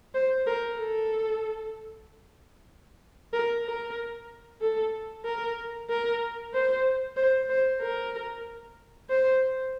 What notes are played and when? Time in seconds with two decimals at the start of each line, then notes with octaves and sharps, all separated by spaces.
0.14 C5
0.47 A#4
0.78 A4
3.33 A#4
3.65 A#4
4.61 A4
5.25 A#4
5.90 A#4
6.54 C5
7.17 C5
7.50 C5
7.81 A#4
9.09 C5